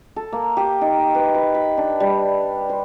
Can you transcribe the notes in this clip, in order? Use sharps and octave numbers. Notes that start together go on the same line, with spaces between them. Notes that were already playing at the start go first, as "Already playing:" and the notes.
A4
A#3
G4
D#4
B4
B4
B5
D4
G3
C5